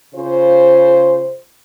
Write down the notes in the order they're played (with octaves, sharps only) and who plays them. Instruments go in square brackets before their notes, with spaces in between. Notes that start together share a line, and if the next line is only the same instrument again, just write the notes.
[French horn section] C#3 F4 C5